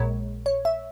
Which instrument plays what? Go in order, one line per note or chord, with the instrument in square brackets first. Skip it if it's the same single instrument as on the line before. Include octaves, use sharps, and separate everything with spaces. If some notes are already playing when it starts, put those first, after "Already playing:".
Already playing: [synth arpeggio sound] A#1 A#2 G#3 C#5
C#5
E5